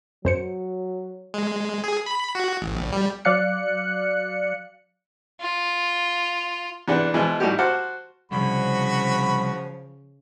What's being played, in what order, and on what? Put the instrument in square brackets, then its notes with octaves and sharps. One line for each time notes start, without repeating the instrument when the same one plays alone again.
[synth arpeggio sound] F#2 C5 C#7 [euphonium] F#3
[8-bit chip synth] G#3
G#4
B5
F#4
A1
A#1
G3
[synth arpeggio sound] F#3 D5 F5 F#6 C#7
[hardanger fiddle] F4
[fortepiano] E2 C3 D4 B4 F#5 F#6
B2 E3 F3 G#3
A2 G3 A3 D#4 F#4 G4
F#4 C5 F#5 A5 D6 F6
[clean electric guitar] C2 [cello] C#3 [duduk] F3 [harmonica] F#4 B5